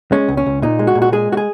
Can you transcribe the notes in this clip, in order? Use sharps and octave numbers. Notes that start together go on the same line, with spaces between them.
G#3 C#4
C#2
C#4
C#2
A#2 D#4
G#3
F#4
A#2
F#4
G#3 G#4
F#4
G#4